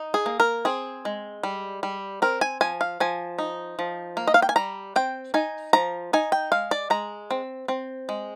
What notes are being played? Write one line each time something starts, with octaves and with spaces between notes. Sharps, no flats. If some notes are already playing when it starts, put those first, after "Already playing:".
Already playing: D#4
G#4
A#3
A#4
C4 G#4
G#3
G3
G3
C4 A#4
G#5
F3 G#5
F5
F3 G#5
D#4
F3
A#3
D#5
F5
G5
G#5
G3 A#5
C4 G5
D#4 G#5
F3 A#5
D#4 G#5
G5
G#3 F5
D5
G#3 A#5
C4
C4
G#3